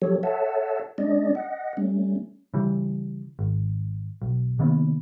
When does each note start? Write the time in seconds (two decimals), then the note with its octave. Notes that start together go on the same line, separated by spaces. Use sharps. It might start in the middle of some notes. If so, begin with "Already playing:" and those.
0.02 F3 F#3 G4 A4 C#5
0.23 A4 C#5 E5 F#5 A5
0.98 G#3 C#4 D4 D5 D#5
1.35 D#5 F#5
1.77 G3 A3 C#4
2.54 C#3 E3 G3
3.39 G#1
4.22 B1
4.59 C3 D#3 A#3 B3